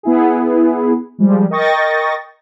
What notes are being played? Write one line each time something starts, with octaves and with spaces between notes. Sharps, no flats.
B3 E4 G#4
F3 G3 G#3
A#4 D#5 G5 C#6 A6 A#6